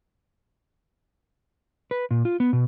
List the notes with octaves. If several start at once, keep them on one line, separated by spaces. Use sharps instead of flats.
B4
A#2
F4
B3
B2